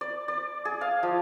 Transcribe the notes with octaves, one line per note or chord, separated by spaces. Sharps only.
D5
D5
G#4
F5
F3